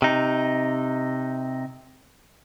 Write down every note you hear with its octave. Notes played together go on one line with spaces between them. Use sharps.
C3 D#4